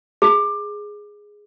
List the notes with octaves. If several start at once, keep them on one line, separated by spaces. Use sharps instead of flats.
G#4